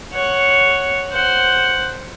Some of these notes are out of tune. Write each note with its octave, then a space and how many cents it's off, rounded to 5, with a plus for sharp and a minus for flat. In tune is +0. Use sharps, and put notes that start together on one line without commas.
C#5 +0 F#5 +0
C5 +0 F#5 +5